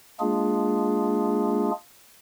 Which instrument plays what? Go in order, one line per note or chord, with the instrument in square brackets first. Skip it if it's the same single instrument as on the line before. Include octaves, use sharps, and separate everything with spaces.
[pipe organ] G#3 A#3 D4 F4 G#4